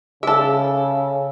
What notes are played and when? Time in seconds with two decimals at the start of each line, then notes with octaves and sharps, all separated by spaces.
0.23 C#3 G#4 A4 E5